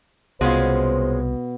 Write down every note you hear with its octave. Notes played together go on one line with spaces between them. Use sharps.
C2 B2 G#3 C#4 F4 C5